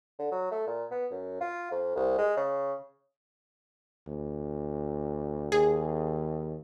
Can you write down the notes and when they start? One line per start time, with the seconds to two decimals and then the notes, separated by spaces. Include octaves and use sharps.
0.19 D3
0.31 F#3
0.51 A3
0.67 A#2
0.91 B3
1.11 F#2
1.41 F4
1.71 F2
1.96 C2
2.18 G#3
2.37 C#3
4.08 D2
5.52 D#2 G#4